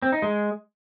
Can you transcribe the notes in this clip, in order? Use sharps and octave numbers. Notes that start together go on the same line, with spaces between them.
C4
D#4
G#3